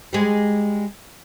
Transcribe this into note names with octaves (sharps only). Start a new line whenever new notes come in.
G3 G#3